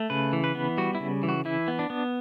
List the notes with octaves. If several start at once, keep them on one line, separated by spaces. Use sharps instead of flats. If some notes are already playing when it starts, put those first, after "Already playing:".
Already playing: A3
C#3 B4
E3
B4
B3
G3 F#4
E4
C#3
E3
F#4
E3 E4
B3
D4
B3